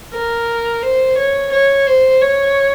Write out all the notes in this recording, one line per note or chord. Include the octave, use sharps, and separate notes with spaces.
A#4
C5
C#5
C#5
C5
C#5